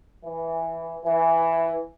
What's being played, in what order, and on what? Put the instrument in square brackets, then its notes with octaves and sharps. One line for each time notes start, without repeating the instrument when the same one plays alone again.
[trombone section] E3
E3